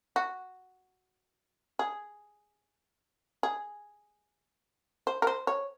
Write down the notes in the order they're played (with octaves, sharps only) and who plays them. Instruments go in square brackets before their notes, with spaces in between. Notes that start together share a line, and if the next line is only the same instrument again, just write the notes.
[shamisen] F#4
G#4
G#4
C5
A#4
C5
C#5